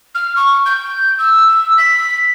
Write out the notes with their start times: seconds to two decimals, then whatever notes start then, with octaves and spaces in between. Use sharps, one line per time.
0.15 F6
0.36 C#6
0.66 G6
1.18 E6
1.77 B6